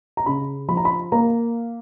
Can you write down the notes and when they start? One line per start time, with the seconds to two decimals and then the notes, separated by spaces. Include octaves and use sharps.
0.17 A#5
0.26 C#3 B5
0.68 F3 B5
0.77 A#5
0.85 B5
1.12 A#3 A#5